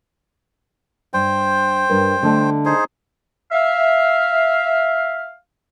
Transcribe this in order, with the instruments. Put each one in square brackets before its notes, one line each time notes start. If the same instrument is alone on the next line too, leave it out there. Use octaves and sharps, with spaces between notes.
[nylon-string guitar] G2 [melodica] C5 G5
[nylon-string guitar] G2 A#4 B4
D3 A3 D#5
[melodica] D#4 G#4 C5
[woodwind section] E5 F5